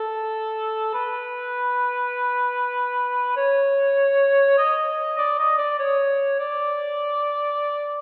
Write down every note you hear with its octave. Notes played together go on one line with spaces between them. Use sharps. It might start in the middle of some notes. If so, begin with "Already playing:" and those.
Already playing: A4
B4
C#5
D#5
D5
D#5
D5
C#5
D5